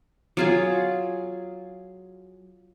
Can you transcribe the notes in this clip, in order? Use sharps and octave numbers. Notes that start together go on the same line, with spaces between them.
F#3 F4 G#4